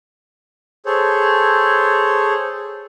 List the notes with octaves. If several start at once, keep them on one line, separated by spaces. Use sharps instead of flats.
G#4 A4 C5 C#5